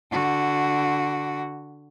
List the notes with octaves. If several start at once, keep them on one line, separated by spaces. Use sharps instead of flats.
D3 F#4